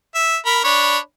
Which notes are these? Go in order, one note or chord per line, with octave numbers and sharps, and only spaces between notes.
E5
A#4 B5
D4 C#5 B5